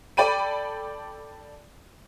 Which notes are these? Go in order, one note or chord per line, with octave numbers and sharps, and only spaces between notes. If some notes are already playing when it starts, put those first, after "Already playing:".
A4 D5 G5 B5 D#7